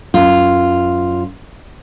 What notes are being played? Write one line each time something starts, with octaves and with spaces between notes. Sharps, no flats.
F#2 F4